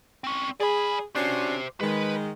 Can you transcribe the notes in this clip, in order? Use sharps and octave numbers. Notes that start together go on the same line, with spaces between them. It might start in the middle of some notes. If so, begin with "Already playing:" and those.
C4 C#4
G#4 D5 B5
C#4 D4 F#4 G4 C5
D#3 G#3 B4